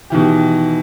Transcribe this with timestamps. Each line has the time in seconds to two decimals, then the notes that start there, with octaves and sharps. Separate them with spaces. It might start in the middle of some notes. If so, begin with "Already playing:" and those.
0.10 B2 D#3 E3 G4